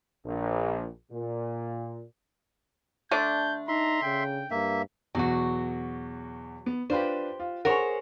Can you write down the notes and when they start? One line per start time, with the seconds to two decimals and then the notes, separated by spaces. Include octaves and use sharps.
0.24 A#1
1.12 A#2
3.11 D3 A3 D4 G6
3.68 D#4 E5 A#5 C6
4.03 C#3 G5
4.51 G2 A#3 E5
5.15 E2 B2 F#3 F#4
6.66 B3
6.90 D4 F4 G4 B4 C5
7.40 F4
7.65 G#4 A#4 C5 C#5 F#5